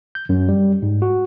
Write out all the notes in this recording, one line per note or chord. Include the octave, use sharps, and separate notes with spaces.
G6
F#2
G3
G#2
F#4